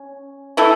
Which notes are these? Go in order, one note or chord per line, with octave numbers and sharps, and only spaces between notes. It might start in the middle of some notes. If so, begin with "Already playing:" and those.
Already playing: C#4
E3 A3 E4 A4